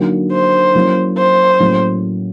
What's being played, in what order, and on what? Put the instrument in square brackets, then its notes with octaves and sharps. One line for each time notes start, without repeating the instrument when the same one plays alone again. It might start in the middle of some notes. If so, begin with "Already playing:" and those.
Already playing: [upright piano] D3 F#3 A#3 D#4 F#4
[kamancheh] C5
[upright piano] F#3 A#3 C#4 E4
[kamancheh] C5
[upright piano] A2 F#3 A#3 C#4